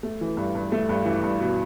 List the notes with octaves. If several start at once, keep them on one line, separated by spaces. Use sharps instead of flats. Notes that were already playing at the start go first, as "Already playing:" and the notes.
A3
E3
G2
G2
A3
G2
E3
G2
B2